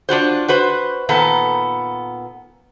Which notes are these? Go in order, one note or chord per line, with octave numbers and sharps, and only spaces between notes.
D4 F4 F#4 C5
F#4 B4 C5
A#2 D#3 B3 A4